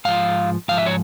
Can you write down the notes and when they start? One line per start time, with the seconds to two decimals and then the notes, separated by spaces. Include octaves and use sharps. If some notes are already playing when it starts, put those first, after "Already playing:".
0.05 G#2 F3 F5
0.68 G#2 F3 F5
0.78 E5
0.86 C#5